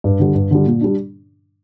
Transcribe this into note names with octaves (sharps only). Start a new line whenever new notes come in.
G2
D3 G3
G2
D3 G3
A#2
G3 D4